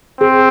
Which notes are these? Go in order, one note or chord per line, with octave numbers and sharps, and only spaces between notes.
C4 G#4